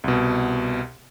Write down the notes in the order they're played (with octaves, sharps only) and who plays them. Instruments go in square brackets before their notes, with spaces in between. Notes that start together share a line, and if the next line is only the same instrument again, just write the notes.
[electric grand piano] C2 B2